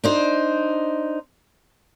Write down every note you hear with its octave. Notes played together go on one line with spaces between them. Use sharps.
D4 D#4 C5